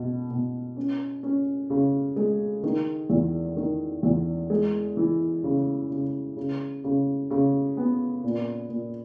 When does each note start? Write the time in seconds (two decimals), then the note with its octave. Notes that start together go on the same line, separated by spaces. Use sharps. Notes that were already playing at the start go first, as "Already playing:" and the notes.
Already playing: B2
0.31 B2
0.77 C#4
1.23 C#4
1.70 C#3
2.16 G#3
2.63 D#3
3.10 E2
3.57 D#3
4.03 E2
4.50 G#3
4.97 E3
5.44 C#3
5.90 C#3
6.37 C#3
6.84 C#3
7.31 C#3
7.77 B3
8.24 A#2
8.70 A#2